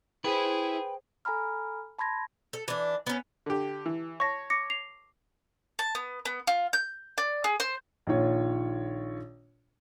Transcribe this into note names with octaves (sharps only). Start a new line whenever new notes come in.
E4 G#4 B4 C5 G5 B5
A4 G#5 A#5 B5 F6
A5 B5 C6 G#6 A#6
A4
E3 D4
B3 C#4
D3 G4
E3
C#5 A5 C#6 A#6
D6 A#6 C#7
C7 F7
A5
B3
B3
F4
G6
D5
G#4
C5
A#1 D#3 F4 C#5